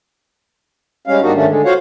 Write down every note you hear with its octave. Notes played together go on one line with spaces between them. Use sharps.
G3 G#3 C#4 F5
G#2 G3 A#3 D4 D#4 F#4
G#2 D#3 A3 C#4 D4
D3 G#3
F4 F#4 C5 C#5 F5 F#5